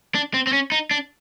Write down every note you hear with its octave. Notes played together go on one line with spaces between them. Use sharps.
D4
C4
C4
C#4
D#4
D4